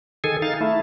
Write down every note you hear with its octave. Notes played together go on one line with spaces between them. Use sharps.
D#3 G#4 A4 G#5
D#4 F5 A6
A3 E4